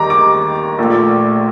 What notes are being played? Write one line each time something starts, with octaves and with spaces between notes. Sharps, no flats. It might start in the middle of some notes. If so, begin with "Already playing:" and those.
Already playing: D#2 D#3 G3 A#5 D6
D6
A#1 A#2 A3